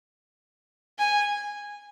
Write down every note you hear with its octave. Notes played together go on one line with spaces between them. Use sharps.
G#5